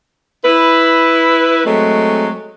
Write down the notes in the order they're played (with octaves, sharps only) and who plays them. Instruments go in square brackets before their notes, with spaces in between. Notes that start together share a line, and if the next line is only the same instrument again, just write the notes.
[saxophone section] E4 B4
F#3 G#3 A3 C4